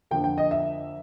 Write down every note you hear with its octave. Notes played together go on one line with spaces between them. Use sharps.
F2 D3 F3 A#3 G5
G5
D#5
E5